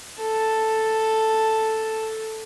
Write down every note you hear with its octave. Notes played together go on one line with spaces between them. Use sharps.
A4 A5